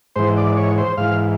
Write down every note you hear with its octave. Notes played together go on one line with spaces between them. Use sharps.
G#2 E3 C5
D5
C#5
C5
G#2 E3 F5